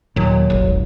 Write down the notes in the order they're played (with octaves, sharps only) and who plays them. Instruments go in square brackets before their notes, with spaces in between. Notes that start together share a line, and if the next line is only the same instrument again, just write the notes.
[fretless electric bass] D#2 A#2 [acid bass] F#3
[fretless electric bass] D#1 G#1